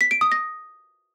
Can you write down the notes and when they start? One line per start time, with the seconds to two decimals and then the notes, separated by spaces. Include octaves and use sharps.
0.01 B6
0.11 D7
0.21 D#6
0.32 A#6